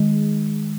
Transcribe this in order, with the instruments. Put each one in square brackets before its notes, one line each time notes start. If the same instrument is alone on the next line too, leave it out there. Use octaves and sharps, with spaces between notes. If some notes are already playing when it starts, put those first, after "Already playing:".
Already playing: [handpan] D#3 G#3